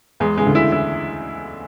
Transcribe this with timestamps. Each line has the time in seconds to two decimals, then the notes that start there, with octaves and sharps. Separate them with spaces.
0.20 E2 E3 G#3
0.37 C#3 G#3
0.46 D2 D3
0.55 E4
0.72 E4